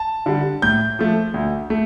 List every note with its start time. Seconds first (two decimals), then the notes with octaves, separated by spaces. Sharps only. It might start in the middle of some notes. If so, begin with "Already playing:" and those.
Already playing: A5
0.26 D3 G3
0.62 A2 G6
0.99 F3 A3
1.34 D2
1.70 A3